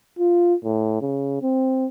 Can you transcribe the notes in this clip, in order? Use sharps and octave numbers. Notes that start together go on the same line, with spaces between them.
F4
A2
C#3
C4